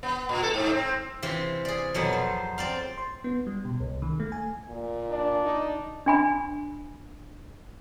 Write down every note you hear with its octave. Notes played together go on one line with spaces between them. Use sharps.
B3
A#2
A4
G#2
C4
C3 E3 C4 F4
G#4 D5
F2 B2 F#3 B3
C5
C4 D5 F5
C6
B3
G3
B2
C2
D#3
A3
G#5
A#2
D4
D#4
D4 G#5 B5